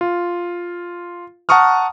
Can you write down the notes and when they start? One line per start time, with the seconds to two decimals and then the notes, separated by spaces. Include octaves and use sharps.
0.01 F4
1.49 F#5 A5 A#5 C#6 D#6 F6